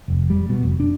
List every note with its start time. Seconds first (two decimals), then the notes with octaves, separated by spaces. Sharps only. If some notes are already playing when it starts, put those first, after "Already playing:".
0.08 F1
0.30 G3
0.49 B2
0.63 F1
0.80 D4